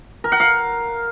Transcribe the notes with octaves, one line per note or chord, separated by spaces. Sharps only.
A#4
F#5
F5